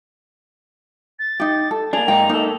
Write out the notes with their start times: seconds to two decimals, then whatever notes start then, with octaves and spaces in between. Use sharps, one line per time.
1.19 A6
1.40 D#4 G4
1.71 A4
1.93 A#3 D4 G#4 F7
2.08 G#2 A#3 D#4 G5
2.29 A#3 D#4 A4